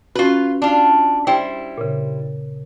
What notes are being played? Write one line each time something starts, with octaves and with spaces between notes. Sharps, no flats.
C#4 F4 F#4 B4
D4 F4
G3 E4 C5 G5
A#2 C#3